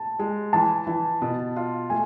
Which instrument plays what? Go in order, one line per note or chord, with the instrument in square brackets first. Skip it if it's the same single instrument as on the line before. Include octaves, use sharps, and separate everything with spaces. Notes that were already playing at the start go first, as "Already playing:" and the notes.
Already playing: [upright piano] A5
[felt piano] G#3
[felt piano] E3 [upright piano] A5
[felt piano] E3
B2
F4
[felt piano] A3 [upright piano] G#5